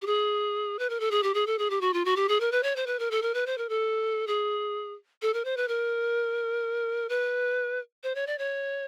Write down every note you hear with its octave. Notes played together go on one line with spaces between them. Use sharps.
G4
G#4
B4
A#4
A4
G#4
G4
G#4
A4
G#4
G4
F#4
F4
F#4
G4
G#4
A#4
B4
C#5
C5
B4
A#4
A4
A#4
B4
C5
A#4
A4
G#4
A4
A#4
C5
B4
A#4
B4
C5
C#5
D5
C#5